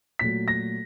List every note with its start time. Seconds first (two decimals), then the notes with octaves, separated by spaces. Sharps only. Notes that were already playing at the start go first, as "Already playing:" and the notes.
0.19 A#2 F#3 A3 B6
0.48 A#6